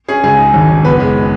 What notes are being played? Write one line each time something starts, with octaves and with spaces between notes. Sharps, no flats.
C#4 G#4
C#2 G#4
D#4
G#1
G#1
F#1 B3 B4
G#3